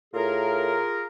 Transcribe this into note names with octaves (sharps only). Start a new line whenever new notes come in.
A2 F4 G#4 A#4